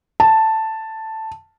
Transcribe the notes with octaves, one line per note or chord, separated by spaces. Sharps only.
A5